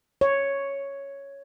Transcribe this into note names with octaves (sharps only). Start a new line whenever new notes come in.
C#5